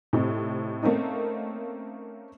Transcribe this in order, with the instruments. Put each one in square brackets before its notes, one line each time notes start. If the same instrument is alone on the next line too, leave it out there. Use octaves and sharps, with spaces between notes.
[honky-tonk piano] A2 C3 C4 D#4
A3 A#3 C4 C#4 D#4